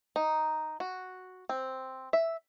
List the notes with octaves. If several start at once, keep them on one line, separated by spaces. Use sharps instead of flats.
D#4
F#4
C4
E5